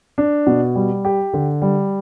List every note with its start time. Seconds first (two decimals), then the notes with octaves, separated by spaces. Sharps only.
0.18 D4
0.47 B2
0.75 G3
1.05 G4
1.33 D3
1.62 G3